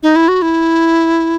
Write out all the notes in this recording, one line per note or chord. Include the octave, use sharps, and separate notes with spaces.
D#4
E4
F#4
E4